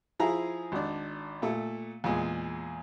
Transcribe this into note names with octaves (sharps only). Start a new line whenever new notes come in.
F3 E4 G#4 A#5
G#1 D4
A#2 A3
E2 A#2 G#3